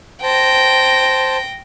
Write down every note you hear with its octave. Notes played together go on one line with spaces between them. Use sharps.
C5 G5 A5 A#6